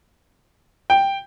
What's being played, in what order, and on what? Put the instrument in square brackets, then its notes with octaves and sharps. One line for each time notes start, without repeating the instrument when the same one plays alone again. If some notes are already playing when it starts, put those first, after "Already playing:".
[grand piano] G5